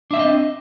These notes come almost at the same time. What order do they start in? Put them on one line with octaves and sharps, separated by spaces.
D4 E5 C4 D#5